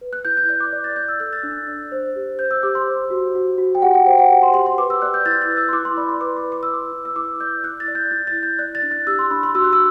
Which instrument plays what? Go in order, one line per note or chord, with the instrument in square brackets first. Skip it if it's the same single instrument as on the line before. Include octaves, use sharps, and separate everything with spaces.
[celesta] B4
F#6
E4 G6
G6
D5 F#6
D6
D5
A6
D5 G6
E6
A4 F#6
A6
D4
D5
C5
G4
C5 G6
E6
G4 D6
C6
C5
F#4
F#4
F#4
G5
G4 F#5
G5
C5 G5
F#5
G4 G5
C6
G4 C6
C6
B4 D6
E6
D5 F#6
G6
E4 A6
F#6
B4
E6
C6
E4 D6
C6
D5 B5
C6
B4 D6
C6
B4
D6
E6
E4
D6
E4
E6
E4 D6
D5 G6
E4 F#6
A6
D5
G6
E4 A6
A6
E4
G6
D5 F#6
A6
D4
F#6
G4 E6
C6
D4 B5
C6
F#4 E6
F#6
E6